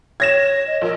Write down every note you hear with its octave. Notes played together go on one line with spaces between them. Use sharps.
C#5 G#6 A#6 E7
D#5
A#1 A#4